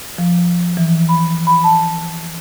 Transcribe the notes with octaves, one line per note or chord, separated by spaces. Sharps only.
F3
E3
B5
B5
A5